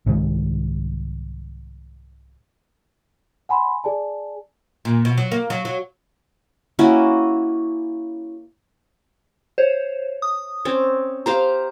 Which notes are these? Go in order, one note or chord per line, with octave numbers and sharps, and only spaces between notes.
C2 G#2 D#3 G#3
F#5 G#5 B5 C6
G#4 D5 G#5 A5
A#2
B2
F#3
A#3
F#3
F#3
A#3 C#4 E4 F#4
C5 C#5
D#6
C4 C#4
G4 C5 F5 A#5